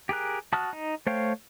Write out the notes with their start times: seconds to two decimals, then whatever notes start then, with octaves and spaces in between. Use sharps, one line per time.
0.09 G4 G#4 A#4 F#6
0.53 F#4 A5 D#6 F6 F#6
0.73 D#4
1.07 A3 C5 C#5 F5 G5